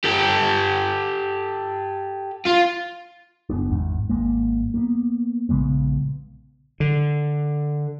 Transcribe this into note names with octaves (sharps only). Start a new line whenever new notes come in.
G4 A4
F4
F#1 B3 D4
G#1 E2 G#2
G#1 G#3 A#3
A#3 B3
A#1 C#3 G#3 B3
D3